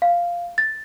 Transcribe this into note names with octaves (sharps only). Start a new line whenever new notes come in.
F5
A6